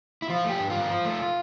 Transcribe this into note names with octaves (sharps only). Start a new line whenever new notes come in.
E4
F3 F4
A3
G4
G2
G2 F4
F3
A3